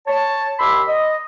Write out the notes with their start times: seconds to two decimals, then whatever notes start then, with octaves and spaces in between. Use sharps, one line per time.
0.07 C#5 A5
0.59 D#2 B5 C6 D6 E6
0.87 D#5